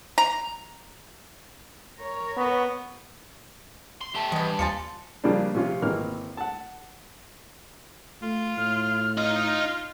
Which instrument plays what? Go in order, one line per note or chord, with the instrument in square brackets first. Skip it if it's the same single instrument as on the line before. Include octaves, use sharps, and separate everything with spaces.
[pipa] A#5
[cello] A#4 C#5
[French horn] B3
[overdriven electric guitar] C6
[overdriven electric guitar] A3 G4 [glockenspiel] A5 G7
[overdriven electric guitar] G2 [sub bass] E3 [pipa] G#3 B3
[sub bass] D#2 [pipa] F3 F4 A5 [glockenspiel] G#5 C6 C#7
[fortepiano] C#3 F3 G3 A#3 D4
C3 F3 C#4 F4
G#1 E3 A#3 F6
F#5 A5
[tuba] A3 [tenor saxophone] F4
[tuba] A2 [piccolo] F6
[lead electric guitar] D#4 D#5 [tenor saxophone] F4 [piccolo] F6